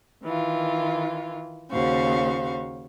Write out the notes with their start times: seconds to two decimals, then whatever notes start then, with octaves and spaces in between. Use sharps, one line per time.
0.23 D#3 E3 F4
1.71 D#2 C#3 F#4 C5 F5 C#6